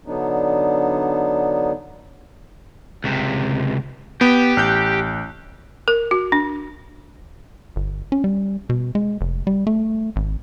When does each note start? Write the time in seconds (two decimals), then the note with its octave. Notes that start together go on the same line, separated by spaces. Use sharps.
0.06 D3 F#3 B3 D4 D#4
3.04 C#2 C3
4.21 B3 G4 G5
4.57 A1 F#6 G6
5.88 A#4
6.11 F#4
6.32 D4
7.76 G1
8.12 C#4
8.24 G3
8.70 B2
8.95 G#3
9.21 F1
9.47 G3
9.67 A3
10.16 G#1